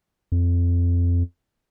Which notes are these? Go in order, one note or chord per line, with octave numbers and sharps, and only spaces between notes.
F2